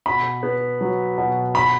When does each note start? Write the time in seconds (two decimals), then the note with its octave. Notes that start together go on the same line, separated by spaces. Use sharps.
0.06 B2 B5
0.43 B3
0.81 F#3
1.18 B2
1.55 B5